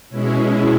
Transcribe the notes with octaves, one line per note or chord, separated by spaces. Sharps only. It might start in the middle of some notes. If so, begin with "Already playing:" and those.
B2 G#3 C#4 E4